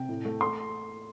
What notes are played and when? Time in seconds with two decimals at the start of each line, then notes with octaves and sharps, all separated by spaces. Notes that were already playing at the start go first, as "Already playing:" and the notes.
Already playing: C3 G5
0.09 A2
0.25 A3
0.41 C6